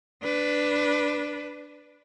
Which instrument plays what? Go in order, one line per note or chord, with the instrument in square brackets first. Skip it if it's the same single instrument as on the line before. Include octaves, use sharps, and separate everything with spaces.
[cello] D4 B4